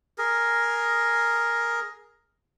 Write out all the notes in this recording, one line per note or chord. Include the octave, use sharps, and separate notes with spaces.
G#4 A#4